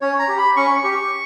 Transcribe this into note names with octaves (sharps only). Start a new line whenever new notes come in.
C#4 C#5
A#5
G4
B5
C#4 C#6
G4 C#6